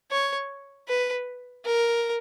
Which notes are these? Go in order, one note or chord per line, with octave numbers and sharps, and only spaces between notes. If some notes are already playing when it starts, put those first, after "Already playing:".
C#5
B4
A#4